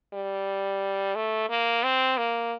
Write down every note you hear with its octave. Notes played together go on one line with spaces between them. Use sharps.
G3
A3
A#3
C4
A#3